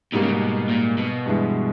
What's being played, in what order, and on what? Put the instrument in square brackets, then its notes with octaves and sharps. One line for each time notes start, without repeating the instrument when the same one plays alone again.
[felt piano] G#2 G3 A#3 [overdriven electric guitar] B2
[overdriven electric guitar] C#3
B2
A#2
B2
[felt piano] G2 E3 G#3